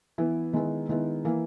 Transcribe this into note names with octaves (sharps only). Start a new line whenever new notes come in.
E3 B3 E4
D#3 G#3 B3 E4
D#3 G#3 B3 E4
E3 A#3 E4